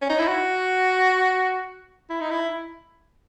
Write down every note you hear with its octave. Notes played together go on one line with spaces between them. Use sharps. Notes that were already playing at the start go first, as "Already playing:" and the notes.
C#4
D#4
E4
F#4
E4
D#4
E4